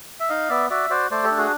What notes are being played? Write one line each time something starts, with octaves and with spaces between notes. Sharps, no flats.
E5
D#4 D#5 F5
B3 D5 E5
F#4 D5 E5
F#4 C5 D5
A3 C5 D5
G4 A4
D4
F#4 G#4